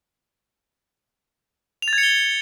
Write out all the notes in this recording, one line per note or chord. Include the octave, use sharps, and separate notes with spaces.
F7
A6
G#6
C#7
G7